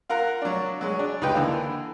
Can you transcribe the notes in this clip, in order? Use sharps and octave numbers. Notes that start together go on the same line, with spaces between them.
F4 A#4 F#5 A#5
F#3 D4
F#3 G#3
D4
C#2 D#4 G4 B4 G5
D3 E3 A#3